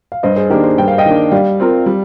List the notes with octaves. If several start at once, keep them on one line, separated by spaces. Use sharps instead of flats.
F5
G2 C5 D#5
G#4 C5
D#3 A#3 D4 G4 A#4
G#4 C5
G2 G5
F5
D#5 G5
D#3 A#3 D4
G3 D5 F5
C4 F4 A#4
G3